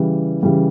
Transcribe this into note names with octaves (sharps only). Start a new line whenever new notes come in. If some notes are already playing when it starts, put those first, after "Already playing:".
Already playing: C#3 E3 G3
C#3 E3 G3